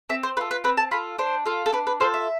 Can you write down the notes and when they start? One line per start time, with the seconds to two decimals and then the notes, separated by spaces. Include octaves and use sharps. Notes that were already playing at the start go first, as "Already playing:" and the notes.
0.09 C4 E5
0.23 C5
0.37 F4 A4 B4
0.51 B4
0.64 C4 B4
0.77 A5
0.91 F4 A4 B5
1.18 D4 C5
1.46 F4 A4
1.66 A4
1.73 D4 B4
1.87 B4
2.00 F4 A4 C5
2.14 E5